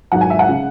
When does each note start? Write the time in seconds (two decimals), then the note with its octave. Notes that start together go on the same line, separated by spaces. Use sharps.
0.12 G#1 G#2 F#3 F#5
0.21 G#5
0.30 E5
0.39 F#5
0.49 C#3